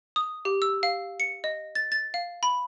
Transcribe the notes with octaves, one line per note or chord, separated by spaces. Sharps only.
D#6
G4
E6
F5
C#7
D#5
A6
A6
F5
B5